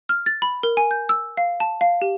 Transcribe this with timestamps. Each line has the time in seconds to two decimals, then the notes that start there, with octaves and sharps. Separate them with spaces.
0.09 F6
0.26 A6
0.42 B5
0.63 A#4
0.77 G#5
0.91 G6
1.09 E6
1.37 F5
1.60 A5
1.81 F5
2.02 G4